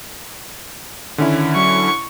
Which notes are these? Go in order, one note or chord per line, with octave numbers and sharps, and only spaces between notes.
D3 D#3 C#4 E4
F#3 C#6